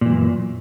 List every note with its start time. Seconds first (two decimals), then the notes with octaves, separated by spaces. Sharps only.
0.01 A#2
0.06 E3
0.10 F#2